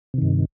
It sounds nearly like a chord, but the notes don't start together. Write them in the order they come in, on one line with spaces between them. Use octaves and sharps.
C3 D#3 G2